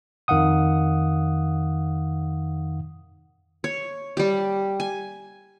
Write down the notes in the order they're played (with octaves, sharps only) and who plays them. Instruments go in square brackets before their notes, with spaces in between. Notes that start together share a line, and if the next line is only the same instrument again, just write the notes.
[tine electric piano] F2 D#3 F5 F#5 D#6
[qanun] C#5
G3 G4
G#5